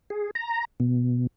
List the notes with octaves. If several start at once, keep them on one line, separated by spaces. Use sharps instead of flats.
G#4
A#5
B2